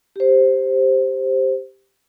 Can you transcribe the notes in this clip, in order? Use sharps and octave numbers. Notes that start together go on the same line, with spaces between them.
G4 C5